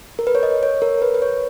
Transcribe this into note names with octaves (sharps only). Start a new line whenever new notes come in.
A#4
B4
C#5
D#5
C#5
A#4
B4
B4
C#5